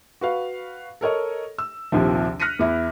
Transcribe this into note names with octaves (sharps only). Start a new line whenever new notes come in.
F#4 B4 F5
A4 A#4 C#5 D#5
E6
A#1 D#2 C3 F3
F6 F#6 A#6 B6 C#7 D#7
E2 E4